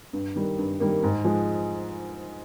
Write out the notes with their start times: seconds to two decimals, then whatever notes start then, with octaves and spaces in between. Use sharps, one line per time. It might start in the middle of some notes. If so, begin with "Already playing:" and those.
0.13 G2
0.35 D#3 G3 A#3
0.58 G2
0.80 D#3 G3 A#3
1.03 G#2
1.24 F3 G#3